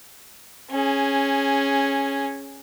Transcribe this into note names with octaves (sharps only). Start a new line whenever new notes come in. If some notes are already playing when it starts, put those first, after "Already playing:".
C#4 G#4